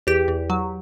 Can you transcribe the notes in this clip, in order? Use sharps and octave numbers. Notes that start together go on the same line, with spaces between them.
E2 G4
E2
F#3